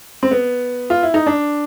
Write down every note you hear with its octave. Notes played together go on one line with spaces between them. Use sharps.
C4
B3
F4
E4
D#4
D4